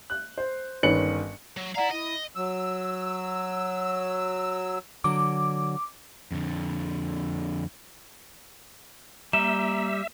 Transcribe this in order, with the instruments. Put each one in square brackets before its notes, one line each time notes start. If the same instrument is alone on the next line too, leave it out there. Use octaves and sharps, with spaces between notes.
[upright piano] F#6
C5
G1 D#3 C#4 B4 C#7 F#7
[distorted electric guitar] F#3
[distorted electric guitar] E4 F5 [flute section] D5 F#5 A#5
[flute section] E4 [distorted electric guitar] D#5
[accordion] F#3 E6
[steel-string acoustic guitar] D3 F#3 [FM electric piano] D6
[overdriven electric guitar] F2 D3
[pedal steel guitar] G3 [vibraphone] A#3 [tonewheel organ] E5 [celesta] E7